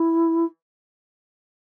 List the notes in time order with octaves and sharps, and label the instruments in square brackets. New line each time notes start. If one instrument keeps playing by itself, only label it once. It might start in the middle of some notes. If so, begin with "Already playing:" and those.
Already playing: [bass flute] E4